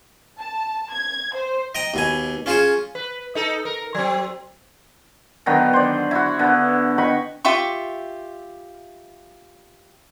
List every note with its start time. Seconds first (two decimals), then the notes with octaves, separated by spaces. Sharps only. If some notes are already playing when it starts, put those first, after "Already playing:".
0.38 A5
0.92 G#6
1.35 C5
1.75 D#5 G5 A#5
1.94 D#2 B2 G#5
2.46 C#4 F4 G#4 C5 C#5
2.95 B4
3.35 D#4 A4
3.65 A#4
3.95 F#3 C4
5.46 D3 D#3 F#3 B3
5.73 C5 D5
6.11 E4 F#4
6.39 D3 B3
6.98 D#5 G5 B5 C#6
7.45 F4 G4 E5 C#6